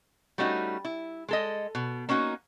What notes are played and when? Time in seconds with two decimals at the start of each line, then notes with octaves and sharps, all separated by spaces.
0.38 G3 A3 C#4 D#4 F#4
0.85 E4
1.29 G#3 A4 D#5
1.75 B2
2.09 A#3 C#4 D#4 F#4